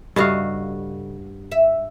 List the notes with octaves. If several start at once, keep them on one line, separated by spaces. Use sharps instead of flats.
G2 C#3 F#4 A4 D#5 F5
E5